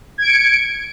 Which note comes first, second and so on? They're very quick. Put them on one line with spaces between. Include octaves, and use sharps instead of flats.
G#6 D7 C#7